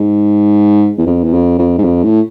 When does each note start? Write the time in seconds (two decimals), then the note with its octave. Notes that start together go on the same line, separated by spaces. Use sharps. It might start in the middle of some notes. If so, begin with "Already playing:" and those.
Already playing: G#2
0.98 E2
1.07 F2
1.24 E2
1.33 F2
1.59 F2
1.78 G#2
1.84 F2
2.04 A2